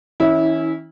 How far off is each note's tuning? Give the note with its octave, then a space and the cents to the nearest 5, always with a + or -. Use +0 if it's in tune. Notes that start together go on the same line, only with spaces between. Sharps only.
E3 -45 C#4 +0 E4 -20